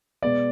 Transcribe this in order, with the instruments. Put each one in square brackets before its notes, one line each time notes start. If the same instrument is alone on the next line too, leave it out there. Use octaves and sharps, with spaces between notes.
[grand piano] B2 G#3 B3 D5